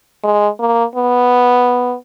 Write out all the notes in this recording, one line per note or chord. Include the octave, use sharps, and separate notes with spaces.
G#3
A#3
B3